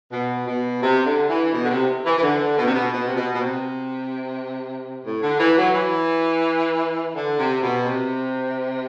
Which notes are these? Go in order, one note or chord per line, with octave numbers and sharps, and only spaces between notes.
B2
B2
C3
D3
E3
B2
D3
C3
E3
E3
D3
B2
C3
B2
B2
C3
B2
B2
C3
A2
D3
E3
F#3
E3
D3
C3
B2
C3